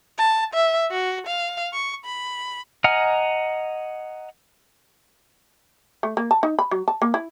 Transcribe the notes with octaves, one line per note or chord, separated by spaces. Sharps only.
A5
E5
F#4
F5
C#6
B5
D#5 F#5 G#5 A#5 F6
A3
A#3
A5
D#4
B5
F#3
A5
A#3
E4